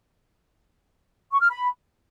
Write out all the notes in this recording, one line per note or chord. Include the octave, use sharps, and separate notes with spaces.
C#6
F6
B5